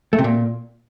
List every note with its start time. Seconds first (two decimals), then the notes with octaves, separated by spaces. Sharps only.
0.13 A3
0.19 C3
0.24 A#2